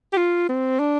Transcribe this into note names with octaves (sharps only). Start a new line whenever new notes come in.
G4
F4
C4
D4